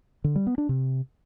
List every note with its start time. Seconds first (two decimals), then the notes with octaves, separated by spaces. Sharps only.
0.24 D3
0.36 G3
0.47 B3
0.58 D4
0.69 C3